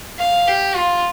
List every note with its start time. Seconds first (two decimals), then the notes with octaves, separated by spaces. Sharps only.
0.18 F5
0.47 G4
0.76 F4